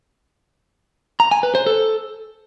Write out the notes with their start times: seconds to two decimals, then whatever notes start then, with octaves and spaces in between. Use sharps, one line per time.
1.20 A#5
1.31 G#5
1.43 B4
1.55 C5
1.66 A4